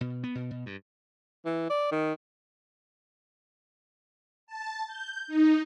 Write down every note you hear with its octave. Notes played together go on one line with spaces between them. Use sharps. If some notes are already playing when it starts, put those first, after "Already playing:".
B2
B3
B2
B2
G2
E3
D5
D#3
A5
G6
D#4